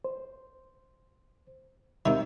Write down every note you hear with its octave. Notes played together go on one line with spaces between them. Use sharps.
C5
C3 D#3 E5